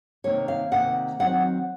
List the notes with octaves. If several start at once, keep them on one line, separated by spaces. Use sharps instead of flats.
C3 D#3 A#3 C#5
F5
C3 D#3 A#3 F#5
D#3 F#3 C4 F#5